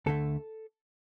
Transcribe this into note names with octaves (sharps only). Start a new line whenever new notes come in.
D2 D3 A3 A4